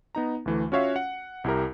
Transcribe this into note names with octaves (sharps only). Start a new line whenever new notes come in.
B3 D#4 A#5
D2 E3 A3
C#4 F4 F#4 C#5 E5 F5
F#5
C2 E4 G4 A#4